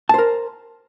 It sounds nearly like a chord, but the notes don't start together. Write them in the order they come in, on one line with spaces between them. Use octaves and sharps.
A5 C5 A#4